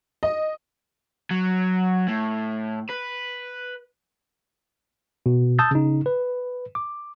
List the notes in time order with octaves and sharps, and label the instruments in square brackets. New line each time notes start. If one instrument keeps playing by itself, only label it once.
[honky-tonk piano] D#5
[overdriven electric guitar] F#3
A2
B4
[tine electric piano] B2
A5 D#6 E6 G6 A6
C#3 D#4
B4
D6